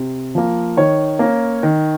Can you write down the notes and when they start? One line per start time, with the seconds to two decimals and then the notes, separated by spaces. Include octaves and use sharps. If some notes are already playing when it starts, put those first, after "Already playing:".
Already playing: C3
0.35 F3 A#3
0.77 D#3 C#5
1.19 A#3 C#4
1.63 D#3